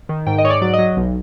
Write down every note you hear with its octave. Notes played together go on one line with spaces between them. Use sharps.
D#3
G#2 G5
D#5
G#2 C#5
D5
F#3 D5
D#5
F#3
B1